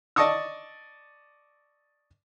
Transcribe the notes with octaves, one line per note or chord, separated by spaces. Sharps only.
D5 D#5 A5 C#6 D#6 E6